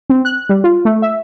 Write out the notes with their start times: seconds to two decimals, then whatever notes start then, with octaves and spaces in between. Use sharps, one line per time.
0.10 C4
0.25 F#6
0.49 G3
0.64 F4
0.85 A3
1.02 E5